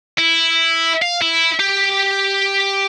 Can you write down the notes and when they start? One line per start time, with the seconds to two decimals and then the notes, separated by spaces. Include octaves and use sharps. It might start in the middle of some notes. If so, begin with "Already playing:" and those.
0.18 E4
1.02 F5
1.22 E4
1.60 G4